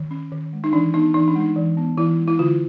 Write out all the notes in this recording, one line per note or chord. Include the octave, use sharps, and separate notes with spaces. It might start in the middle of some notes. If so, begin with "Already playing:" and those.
Already playing: D#3
C#4
D#3
G#3
D#4
E3 D4
B3 D#4
E3 D#4
D4
G#3
D#4
E3
B3
E3 E4
G#3
E4
D3 F4